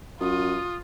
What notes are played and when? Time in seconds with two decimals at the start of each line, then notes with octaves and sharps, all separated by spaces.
0.21 F#2 F4 D#6